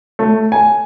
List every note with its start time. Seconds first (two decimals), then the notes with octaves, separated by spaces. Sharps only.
0.19 A3
0.52 G#5